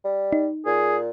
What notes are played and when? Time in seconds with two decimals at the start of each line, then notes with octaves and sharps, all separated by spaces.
0.05 G3
0.33 D#4
0.66 A#2 G#4